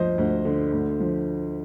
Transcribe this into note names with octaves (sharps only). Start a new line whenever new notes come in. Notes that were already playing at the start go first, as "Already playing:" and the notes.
Already playing: D2 F3 C5 D#5
D2
D3
D2
F3